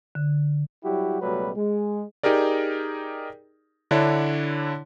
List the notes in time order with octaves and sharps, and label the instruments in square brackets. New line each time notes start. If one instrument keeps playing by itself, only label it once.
[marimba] D3
[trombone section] F#3 G3 E4 F#4 G4
C#2 B2 F#3 G3 A3 B4
G#3
[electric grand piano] D#4 G4 G#4 A#4 D5
D3 D4 E4 C#5